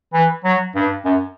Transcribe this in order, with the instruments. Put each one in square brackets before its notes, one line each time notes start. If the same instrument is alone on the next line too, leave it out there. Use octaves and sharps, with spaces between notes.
[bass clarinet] E3
F#3
G2
F#2